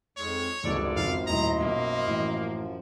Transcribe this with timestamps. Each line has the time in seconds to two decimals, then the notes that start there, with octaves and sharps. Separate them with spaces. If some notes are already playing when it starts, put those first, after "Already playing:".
0.17 F2 G#2 G#3 C#5
0.63 G#1 C#2 F#2 F3 G#3 A4 D5
0.96 G#1 F2 F5
1.27 D#1 A2 E4 C5 D#5 A#5
1.61 B1 A#3
2.07 A1